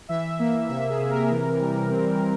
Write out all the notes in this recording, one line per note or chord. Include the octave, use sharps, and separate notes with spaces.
E3 E5
A#3 E5
C3 E5
G#4
C3
A#4
E3
G3
C4
E3